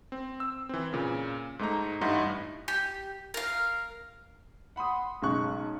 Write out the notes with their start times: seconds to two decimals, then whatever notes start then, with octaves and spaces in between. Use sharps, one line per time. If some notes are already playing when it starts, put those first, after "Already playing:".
0.12 C4
0.40 E6
0.69 E3 C4
0.93 A#2 C#3
1.59 G#2 A3 D#4 A#5
2.01 A1 G2 D#4 E4 F#5 C6
2.68 G4
3.34 A#4 F5
4.76 F#5 B5 C6 D#6
5.22 B1 C#3 G#3 C#4 C#6 F#6